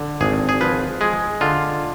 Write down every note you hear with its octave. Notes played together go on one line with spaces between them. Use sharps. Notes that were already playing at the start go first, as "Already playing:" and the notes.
Already playing: D3
G#1 G#4
G#4
F3 B4
G#3 G#4
D3 F4